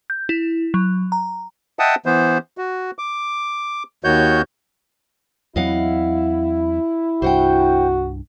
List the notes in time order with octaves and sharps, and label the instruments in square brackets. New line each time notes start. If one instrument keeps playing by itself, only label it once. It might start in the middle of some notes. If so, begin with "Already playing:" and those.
[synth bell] G6
E4
F#3
A#5
[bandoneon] D#5 E5 F#5 G5 A5 D#6
E3 B3 C5
F#4
D6
D#2 D#3 F#4 C#5 G6
[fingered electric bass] E2 F#3 C4 [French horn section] E4 [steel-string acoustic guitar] D#5 F5 F#5
[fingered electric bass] C2 G2 [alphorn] F#4 [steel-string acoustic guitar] C5 F#5 G5